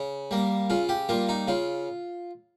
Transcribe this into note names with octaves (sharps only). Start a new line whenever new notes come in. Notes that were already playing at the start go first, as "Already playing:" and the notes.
Already playing: C#3
G3 A#3
C#3 F4
G4
G3 A#3 F4
D#4
C#3 F4